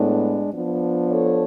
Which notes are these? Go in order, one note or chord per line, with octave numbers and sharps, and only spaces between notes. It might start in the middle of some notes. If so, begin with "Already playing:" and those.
Already playing: A2 G#3 B3 D4
F3 B3 D4
A4 C#5